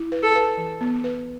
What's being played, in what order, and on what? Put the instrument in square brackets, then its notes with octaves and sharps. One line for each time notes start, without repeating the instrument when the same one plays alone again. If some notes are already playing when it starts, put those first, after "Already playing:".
Already playing: [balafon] E4
B4
[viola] A4
[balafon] B4
E3
B3
B4